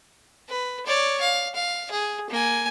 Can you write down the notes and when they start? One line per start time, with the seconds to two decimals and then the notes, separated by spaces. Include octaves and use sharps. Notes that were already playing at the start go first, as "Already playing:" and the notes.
0.49 B4
0.86 C#5 D5
1.21 F5
1.55 F5
1.91 G#4
2.30 A#3 G#5